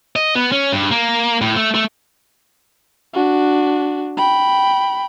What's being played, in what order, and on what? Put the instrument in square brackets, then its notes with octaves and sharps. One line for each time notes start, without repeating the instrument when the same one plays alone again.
[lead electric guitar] D#5
B3
C#4
G2
A#3
A2
A3
A3
[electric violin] D4 F#4
G5 B5